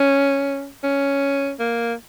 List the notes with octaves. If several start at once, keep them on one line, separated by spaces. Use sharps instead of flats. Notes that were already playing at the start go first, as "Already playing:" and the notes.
Already playing: C#4
C#4
A#3